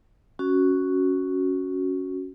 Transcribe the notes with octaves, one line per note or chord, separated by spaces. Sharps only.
C#4 F#4